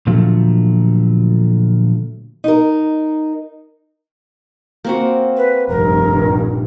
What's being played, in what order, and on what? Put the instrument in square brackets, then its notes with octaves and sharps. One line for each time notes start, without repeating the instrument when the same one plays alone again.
[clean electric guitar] A#2 D3 F3 F#3 A3
[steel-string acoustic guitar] D#4 A#4
[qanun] A#3 C4 F#4
[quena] B4
[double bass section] F1 A#1 G2 [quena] A#4